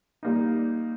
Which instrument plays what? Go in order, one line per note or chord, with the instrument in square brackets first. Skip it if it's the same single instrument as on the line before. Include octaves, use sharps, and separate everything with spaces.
[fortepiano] A#2 G3 A#3 D#4